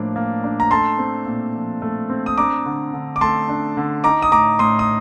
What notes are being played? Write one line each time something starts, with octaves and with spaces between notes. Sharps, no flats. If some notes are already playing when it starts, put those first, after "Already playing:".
Already playing: A2 F3 A#3 D4
A#3
D4
A#5
A3 A5 C6
C4
A#2
F3
A3
C4
D#6
D4 A#5 D6
D3
D3
D6
A3 A5 C6
D4
D3
D#4 A#5 D6
D#6
A2 A#5 D6
A2 C6 D#6
D#6